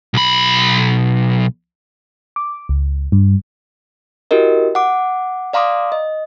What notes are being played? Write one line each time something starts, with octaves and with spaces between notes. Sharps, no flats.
B1 B5
D6
C#2
G2
E4 F#4 G4 A#4 D#5
F#5 D6
D5 F5 A#5 C6 D6 D#6
D#5